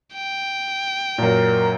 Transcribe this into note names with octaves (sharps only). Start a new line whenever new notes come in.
G5
F#2 A#2 A#4